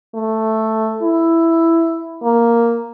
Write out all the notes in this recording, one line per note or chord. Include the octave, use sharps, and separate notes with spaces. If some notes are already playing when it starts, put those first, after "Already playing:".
A3
E4
A#3